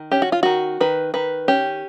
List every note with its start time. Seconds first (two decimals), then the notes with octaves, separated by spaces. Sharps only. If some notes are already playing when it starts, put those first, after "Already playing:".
Already playing: D#3
0.11 C#4 G4
0.22 F#4
0.32 F4
0.43 D#3 F#4
0.80 D#3 B4
1.14 D#3 B4
1.48 C#4 G4